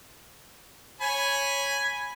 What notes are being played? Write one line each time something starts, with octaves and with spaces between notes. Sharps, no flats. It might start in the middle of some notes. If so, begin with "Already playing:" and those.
C#5 G#5 B5